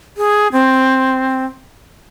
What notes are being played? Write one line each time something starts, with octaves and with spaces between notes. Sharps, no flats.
G#4
C4